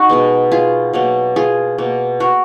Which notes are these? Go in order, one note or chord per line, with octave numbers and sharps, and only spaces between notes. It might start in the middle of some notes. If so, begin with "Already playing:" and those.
Already playing: D#4 F#4
B2 G#3 B3
F4 G#4
B2 F#3 A#3
F4 G#4
B2 A#3
F#4 A#4